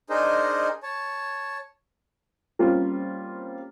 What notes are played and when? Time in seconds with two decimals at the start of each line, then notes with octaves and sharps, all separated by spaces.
0.10 D4 D#4 G#4 A#4 C5 D#5
0.83 C#5 A5
2.59 G3 A#3 C4 C#4 F4